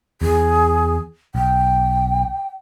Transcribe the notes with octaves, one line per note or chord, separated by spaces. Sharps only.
E2 G#4
B1 G5